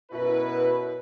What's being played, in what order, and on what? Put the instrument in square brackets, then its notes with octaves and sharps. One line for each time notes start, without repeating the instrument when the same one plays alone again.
[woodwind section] F#2 B2 [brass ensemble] E4 B4